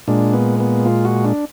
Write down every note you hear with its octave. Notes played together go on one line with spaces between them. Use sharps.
A#2 G#3 D4
B3
B3
F4
F#4
D4